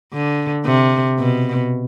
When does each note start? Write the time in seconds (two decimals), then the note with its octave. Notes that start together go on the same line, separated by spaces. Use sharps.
0.13 D3
0.66 C3
1.19 B2